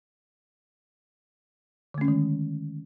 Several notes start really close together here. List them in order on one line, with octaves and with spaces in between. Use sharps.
D3 A3 C#4 G#3 D#3